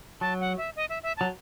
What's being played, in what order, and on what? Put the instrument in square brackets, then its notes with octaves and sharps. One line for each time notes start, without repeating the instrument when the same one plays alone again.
[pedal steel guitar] F#3 [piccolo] A5
[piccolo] F#5
E5
D#5
E5
E5
[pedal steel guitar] F#3 [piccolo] A5